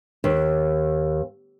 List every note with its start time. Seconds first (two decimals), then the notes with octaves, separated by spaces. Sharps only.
0.24 D#2